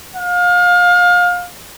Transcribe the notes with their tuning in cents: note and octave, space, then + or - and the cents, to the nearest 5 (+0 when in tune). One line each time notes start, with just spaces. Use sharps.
F5 +30